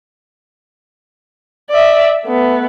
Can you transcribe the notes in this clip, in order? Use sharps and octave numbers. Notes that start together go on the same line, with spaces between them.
D5 E5
A3 B3